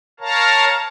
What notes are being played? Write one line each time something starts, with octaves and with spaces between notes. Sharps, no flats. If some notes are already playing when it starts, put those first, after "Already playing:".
A#4 C#5 F5 A5 A#5